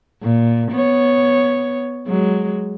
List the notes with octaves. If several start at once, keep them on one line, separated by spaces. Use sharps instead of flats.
A#2
B3 C#5
F#3 G#3